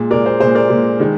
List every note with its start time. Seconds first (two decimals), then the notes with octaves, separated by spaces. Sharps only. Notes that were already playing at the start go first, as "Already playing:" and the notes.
Already playing: A#2 G#3
0.11 A#2 G#3 A#4 D5
0.26 C5
0.40 A#2 G#3 C5
0.55 A#4 D5
0.70 A#2 G#3
1.00 D#3 G#3